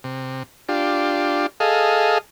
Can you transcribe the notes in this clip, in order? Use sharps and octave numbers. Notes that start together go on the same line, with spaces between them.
C3
D4 F4 G4
G#4 A4 D#5 F5